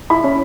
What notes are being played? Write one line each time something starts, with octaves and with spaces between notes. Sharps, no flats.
E4 B5
C#4